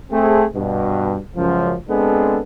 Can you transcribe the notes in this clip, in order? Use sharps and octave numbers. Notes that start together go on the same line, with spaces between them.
A3 C4 G#4
G2 B2
C#2 F#2 F3
G#3 B3 C4 D4 G#4 A4